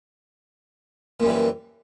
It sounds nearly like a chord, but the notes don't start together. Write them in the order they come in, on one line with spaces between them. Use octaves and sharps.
A#2 F#2 G3 E3